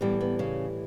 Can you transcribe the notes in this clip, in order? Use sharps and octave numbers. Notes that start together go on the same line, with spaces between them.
A2 E3 G3 B3
B3
C#3 C#4